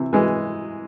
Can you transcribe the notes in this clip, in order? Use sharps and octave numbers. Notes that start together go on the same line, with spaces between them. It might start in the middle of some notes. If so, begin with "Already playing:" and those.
Already playing: C3 E3
E3 G#3